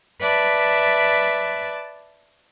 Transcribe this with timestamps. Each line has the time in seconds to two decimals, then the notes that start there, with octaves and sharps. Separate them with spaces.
0.21 B4 D5 E5 A5